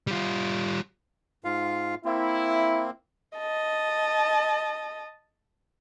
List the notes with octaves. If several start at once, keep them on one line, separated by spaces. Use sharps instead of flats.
G3 F4
G#2 F4 F5
A#3 C4 E4
D#5 A5